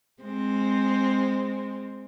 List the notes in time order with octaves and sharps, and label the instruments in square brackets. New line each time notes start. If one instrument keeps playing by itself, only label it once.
[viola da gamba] G#3 C4